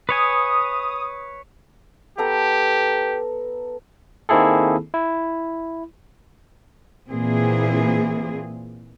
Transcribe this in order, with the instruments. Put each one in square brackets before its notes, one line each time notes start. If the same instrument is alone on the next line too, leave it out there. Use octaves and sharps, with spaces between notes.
[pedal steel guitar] B4 C#5 G#5 [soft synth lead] D#6
[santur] B3 A4 A#5 [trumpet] G4
[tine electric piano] D#3 A#3 C4 E4 G#4 A4
E4
[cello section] A#2 E3 C4 G#4